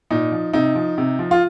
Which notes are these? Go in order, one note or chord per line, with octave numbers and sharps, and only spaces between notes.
A#2 D#4
F3
C3 D#4
F3
C3
F3
F4